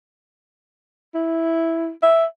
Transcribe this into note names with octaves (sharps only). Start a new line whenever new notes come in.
E4
E5